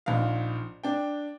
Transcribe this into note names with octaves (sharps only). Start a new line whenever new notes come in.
A#1 G#2 F5
D4 G5